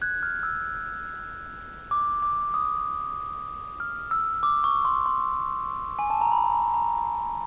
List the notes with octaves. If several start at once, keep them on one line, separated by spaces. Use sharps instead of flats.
F#6 G#6
F6
E6
D6
D6
D#6
F6
E6
D6
C#6
C6
C6
G#5
A5
A#5
B5
A#5
A#5